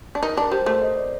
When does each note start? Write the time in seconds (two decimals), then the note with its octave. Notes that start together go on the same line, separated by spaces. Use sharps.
0.15 D4
0.23 D#4 A#4
0.36 D4 A#4
0.51 G3 C5
0.66 A3 C5
0.82 D#5
0.95 D5